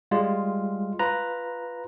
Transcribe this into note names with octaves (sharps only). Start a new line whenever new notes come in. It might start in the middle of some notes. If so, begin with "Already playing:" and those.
G3 G#3 F4
F4 B4 A#5